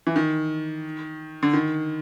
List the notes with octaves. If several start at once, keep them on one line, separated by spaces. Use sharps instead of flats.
E3
D#3
D3
D#3